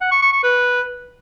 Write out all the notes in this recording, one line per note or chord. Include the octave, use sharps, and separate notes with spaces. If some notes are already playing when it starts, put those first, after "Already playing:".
F#5
C#6
C#6
C#6
B4